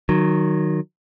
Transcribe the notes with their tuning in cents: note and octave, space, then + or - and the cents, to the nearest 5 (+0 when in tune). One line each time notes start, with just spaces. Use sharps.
D#3 -20 F#3 +0